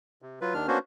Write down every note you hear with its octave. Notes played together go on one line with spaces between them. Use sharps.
C3
F#3 F4 B4
D#2 D#3 D4 F6
A#3 B3 C#4 D4 F#4 C5